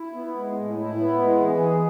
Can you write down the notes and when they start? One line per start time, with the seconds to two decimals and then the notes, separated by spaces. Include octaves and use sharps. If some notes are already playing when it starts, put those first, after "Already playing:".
Already playing: E4
0.14 B3
0.36 G#3
0.56 A2
0.77 E4
0.98 B3
1.19 G#3
1.41 E3
1.63 G#4